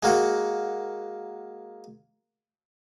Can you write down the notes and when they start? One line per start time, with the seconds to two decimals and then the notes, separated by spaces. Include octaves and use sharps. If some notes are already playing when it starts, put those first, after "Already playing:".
0.03 G#3 A#3 F#4